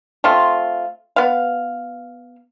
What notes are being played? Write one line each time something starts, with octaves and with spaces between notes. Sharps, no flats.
A3 C4 F4
B3 F5